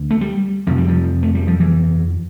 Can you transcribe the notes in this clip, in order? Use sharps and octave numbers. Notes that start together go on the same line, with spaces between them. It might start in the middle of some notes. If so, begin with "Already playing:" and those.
Already playing: D2
A3
G3
F2 C3 F3
G3
F3
A3
G3
F3
E3